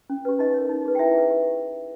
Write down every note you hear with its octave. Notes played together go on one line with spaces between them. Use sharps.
C#4
G4 B4
D#4 D#5
A#4 C#5
D#4
G#4 B4
G5
E4 E5
G#4 B4
G4